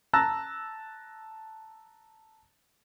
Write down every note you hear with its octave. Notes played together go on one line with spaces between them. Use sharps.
A5 A#5 E6 F#6 A6 A#6